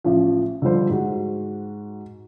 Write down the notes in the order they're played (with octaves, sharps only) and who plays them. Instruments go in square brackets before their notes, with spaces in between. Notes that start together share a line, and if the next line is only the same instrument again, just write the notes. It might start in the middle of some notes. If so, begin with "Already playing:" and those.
[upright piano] A1 F3
D3 F3 G3 C5
G#2 F#4